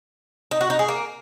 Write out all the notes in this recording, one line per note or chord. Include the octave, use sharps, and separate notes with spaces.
D#4
F#4
D#4
G#4
A#3